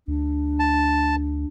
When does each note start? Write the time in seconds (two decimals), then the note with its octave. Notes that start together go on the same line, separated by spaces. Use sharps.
0.08 D2 D4
0.60 A5